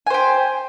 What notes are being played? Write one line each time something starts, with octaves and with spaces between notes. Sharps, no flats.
G4 C5 G#5